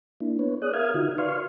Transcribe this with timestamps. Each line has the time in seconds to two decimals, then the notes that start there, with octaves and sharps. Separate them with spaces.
0.21 A#3 D4 E4
0.39 B3 B4 C#5
0.62 G#4 C#5 D5 D#6 F#6
0.73 A#4 E5 F5 D#6 F6 G#6
0.94 D3 D#4 F4 F#4
1.18 B4 D5 F5 C6 C#6 F6